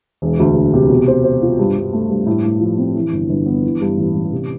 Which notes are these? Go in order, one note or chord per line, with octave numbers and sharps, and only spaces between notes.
E1
D2
D2
C3
B2
C5
C5
F4
G2
G2
A3
G2
A2
A2
F3
C4
E3
G1
G1
B3
E3
G2
A1
A1
C3